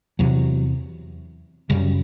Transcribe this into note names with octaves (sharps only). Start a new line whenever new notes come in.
E2 C3 F#3
F#2 C#3 G3